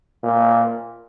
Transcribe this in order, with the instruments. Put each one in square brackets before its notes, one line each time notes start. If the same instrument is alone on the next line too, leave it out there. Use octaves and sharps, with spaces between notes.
[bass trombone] A#2